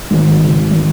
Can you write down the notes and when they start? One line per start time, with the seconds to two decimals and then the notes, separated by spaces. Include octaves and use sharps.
0.11 G#1 G#2 D#3 F#3
0.40 C#3
0.71 D#3